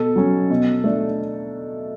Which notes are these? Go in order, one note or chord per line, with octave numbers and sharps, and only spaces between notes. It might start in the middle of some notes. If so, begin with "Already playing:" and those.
Already playing: B2 A4
F#3 C#4
B2
A3 D4